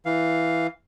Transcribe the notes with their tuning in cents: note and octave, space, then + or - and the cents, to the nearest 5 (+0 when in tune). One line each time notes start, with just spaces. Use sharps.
E3 +0 F5 +0